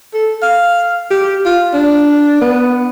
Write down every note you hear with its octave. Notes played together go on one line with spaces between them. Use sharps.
A4
F5
G4
F4
D4
B3